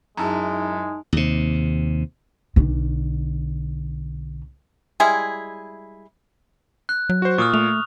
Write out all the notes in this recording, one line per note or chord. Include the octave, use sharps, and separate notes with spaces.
F#2 G#3 D#4 E4 G#4 A5 A#5
D#2 C3
B1 D3
G3 G#3 E4 G#4
F#6
F#3
F#4 C5
A#2 C#6 D#6 F6
A3 F7